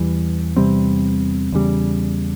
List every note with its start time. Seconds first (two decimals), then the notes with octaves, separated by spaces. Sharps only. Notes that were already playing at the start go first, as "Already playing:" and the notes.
Already playing: E2 E3 G3
0.56 E2 C3 G3 C4
1.53 E2 C#3 G3